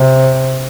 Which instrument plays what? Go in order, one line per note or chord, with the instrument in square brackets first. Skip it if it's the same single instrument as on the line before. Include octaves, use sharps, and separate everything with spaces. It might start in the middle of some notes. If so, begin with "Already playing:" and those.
Already playing: [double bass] C3